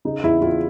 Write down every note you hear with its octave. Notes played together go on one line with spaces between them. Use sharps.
C#3 D#4
E2 E4
E2 F4